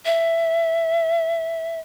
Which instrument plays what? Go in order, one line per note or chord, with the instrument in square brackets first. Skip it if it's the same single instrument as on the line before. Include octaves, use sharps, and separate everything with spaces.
[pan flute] E5